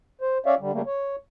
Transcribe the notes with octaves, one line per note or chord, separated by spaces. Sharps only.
C5
C#4 C#5 D5 E5 F5
D3 G3
C#3 G3 A3 A#3
C#5